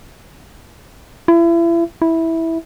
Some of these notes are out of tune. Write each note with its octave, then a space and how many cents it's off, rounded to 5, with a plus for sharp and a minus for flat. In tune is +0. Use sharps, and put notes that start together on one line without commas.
E4 +35
E4 -10